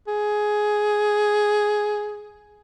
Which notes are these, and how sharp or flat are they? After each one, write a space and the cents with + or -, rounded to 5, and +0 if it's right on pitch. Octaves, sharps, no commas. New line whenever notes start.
G#4 +10